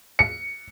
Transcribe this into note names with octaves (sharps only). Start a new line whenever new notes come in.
C#7